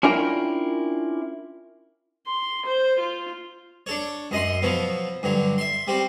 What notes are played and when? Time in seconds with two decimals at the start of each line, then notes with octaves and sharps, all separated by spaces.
0.03 C#4 D4 E4 F4 A#4 G5
2.27 C6
2.66 C5
2.99 F4
3.86 D4 A4 C#5
4.31 F#2 D#5 F#5 C6
4.62 B2 F3 F#3 B3
5.23 G2 D3 F#3
5.58 E5 C6
5.87 G3 C4 F#4